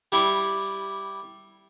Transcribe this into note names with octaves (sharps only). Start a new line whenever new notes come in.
G3 E4 D6